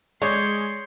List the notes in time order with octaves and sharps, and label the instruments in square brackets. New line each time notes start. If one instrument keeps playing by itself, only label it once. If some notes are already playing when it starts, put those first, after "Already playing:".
[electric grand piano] G#3 G#4 [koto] C#5 [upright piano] D5 G6 [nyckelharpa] C6